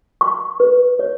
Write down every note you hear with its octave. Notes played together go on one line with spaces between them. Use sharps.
C#6
B4
C#5